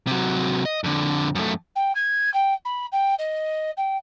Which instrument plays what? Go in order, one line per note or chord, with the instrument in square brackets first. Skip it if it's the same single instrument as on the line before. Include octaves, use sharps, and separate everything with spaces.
[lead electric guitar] C3 F#3
D#5
F2 D3
F#2 A3
[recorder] G5
G#6
G5
B5
G5
D#5
G5